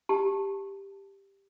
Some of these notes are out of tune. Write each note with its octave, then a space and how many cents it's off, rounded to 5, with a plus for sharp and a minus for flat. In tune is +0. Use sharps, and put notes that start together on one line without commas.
G4 +5 A5 +0